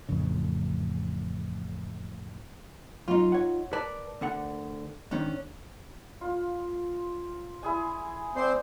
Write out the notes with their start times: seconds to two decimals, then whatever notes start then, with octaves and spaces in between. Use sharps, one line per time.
0.09 A1 F2 C#3
3.08 F#2 D#4 F4
3.32 C#5 F#5
3.73 A#4 B4 D5 A5
4.21 D2 D3 F#5
5.11 G#2 D#3 C#4 D4
6.21 F4
7.63 E4 G#4 G#5
8.36 C4 C5 D5 C6